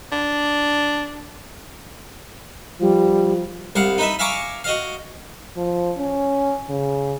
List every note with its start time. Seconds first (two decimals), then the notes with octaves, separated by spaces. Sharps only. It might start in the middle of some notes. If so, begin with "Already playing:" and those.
0.12 D4
2.81 F3 G3
3.76 C2 F5 F#5
3.98 D#4 B4 E5
4.19 E5 F5 G#5 A#5 C#6 D6
4.64 F#4 D#5 F5
5.57 F3
5.98 C#4
6.70 C#3